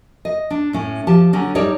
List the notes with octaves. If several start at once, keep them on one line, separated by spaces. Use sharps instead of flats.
D#5
D4
A2 C#4
F3 G4 A5
D3 F#3 C#4
G#2 G3 D#4 C#5 D5 A5